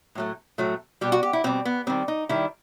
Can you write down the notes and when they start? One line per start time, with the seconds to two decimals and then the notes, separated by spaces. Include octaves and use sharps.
0.15 A2 F#3 A3
0.58 A2 F#3 A3
1.01 B2 G3 G4
1.12 F#4
1.23 G4
1.33 E4
1.44 B2 G3 C4
1.65 B3
1.87 D#3 G3 C4
2.08 D#4
2.29 D#3 G3 E4